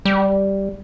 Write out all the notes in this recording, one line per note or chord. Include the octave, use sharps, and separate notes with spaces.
G3